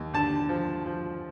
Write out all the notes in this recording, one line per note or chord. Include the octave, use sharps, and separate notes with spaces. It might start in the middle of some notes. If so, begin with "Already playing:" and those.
Already playing: D#2
D3 A5
F3
F3